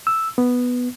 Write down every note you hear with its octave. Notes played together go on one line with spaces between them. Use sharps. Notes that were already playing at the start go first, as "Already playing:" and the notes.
E6
B3